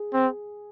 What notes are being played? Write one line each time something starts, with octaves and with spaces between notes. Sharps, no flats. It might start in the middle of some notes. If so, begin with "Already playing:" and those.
Already playing: G#4
C4